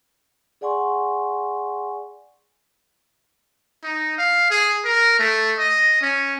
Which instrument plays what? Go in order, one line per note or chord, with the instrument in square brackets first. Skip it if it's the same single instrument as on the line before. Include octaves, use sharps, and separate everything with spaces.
[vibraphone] G#4 D5 F#5 G#5 C6 C#6
[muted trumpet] D#4
F5
G#4
A#4
A3
D#5
C#4